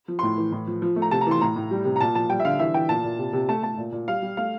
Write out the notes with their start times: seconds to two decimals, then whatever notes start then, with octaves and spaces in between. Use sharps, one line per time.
0.08 F3
0.19 A2 C6
0.38 E3
0.52 A2
0.67 F3
0.82 F3
0.96 A3
1.02 A#5
1.11 C3 A5
1.21 A#5
1.27 E3 C6
1.41 A2 A#5
1.56 A2
1.71 G3
1.85 C3
1.96 A#5
2.01 A#2 A5
2.15 F3 A5
2.30 G3 G5
2.40 E5
2.45 D3 F5
2.59 E3 E5
2.74 E3 G5
2.89 A#2 A5
3.04 A#2
3.19 C3
3.33 C3
3.49 A3 A5
3.63 A3 A5
3.78 A#2
3.92 A#2
4.08 G3 F5
4.22 G3
4.37 A3 F5